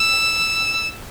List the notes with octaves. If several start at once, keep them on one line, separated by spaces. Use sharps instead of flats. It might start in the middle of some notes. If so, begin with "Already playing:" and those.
Already playing: E6